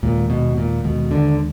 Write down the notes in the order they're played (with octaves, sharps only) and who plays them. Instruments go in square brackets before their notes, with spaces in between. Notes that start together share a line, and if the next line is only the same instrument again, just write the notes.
[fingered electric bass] D#2 D#3 G#3 [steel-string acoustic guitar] A#2
[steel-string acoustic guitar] B2
A#2
[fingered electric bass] D#2 D#3 G#3 [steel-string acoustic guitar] B2
[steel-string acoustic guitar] D3